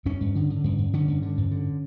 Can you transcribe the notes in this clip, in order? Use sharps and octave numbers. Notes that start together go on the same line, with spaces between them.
G2 C#4
G2
D3
D3
G2
G2
D3 C#4
G2
D3
G2
D3